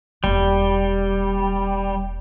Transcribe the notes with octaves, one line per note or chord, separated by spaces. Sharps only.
E1 G3 A#3